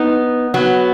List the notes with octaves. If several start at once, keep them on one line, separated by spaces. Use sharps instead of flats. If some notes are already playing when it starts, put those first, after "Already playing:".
Already playing: B3 D#4
F#3 B3